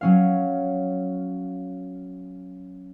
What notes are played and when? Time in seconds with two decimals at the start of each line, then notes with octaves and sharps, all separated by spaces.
0.01 F#3 C#4 F5